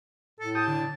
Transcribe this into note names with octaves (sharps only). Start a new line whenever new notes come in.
A2 A4
G4 A5 D#6
D3